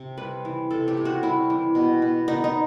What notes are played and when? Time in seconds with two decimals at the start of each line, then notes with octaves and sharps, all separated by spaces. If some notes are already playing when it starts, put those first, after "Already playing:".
Already playing: C3
0.17 G3 B4
0.45 E3
0.71 C3 A4
0.88 G4
0.97 C3
1.05 F#4
1.23 G3 E4
1.50 E3
1.75 B2
2.02 B2
2.28 B3 D#4
2.44 D#4